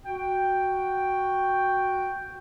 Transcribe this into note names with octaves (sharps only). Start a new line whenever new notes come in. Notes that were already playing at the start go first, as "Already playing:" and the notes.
F#4 G5